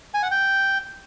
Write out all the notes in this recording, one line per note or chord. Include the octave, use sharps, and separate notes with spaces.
G#5
F#5
G5